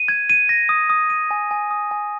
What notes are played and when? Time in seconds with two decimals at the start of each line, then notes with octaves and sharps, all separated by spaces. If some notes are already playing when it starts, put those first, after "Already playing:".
Already playing: D#7
0.08 G#6
0.30 D#7
0.49 A#6
0.69 D#6
0.90 D#6
1.10 D#7
1.31 G#5
1.51 G#5
1.71 D#6
1.91 G#5